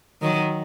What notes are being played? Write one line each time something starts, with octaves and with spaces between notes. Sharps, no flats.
D#3 F#3